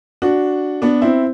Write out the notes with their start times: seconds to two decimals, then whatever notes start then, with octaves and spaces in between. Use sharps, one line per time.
0.22 D4 F#4
0.82 B3 D4
1.01 C4 E4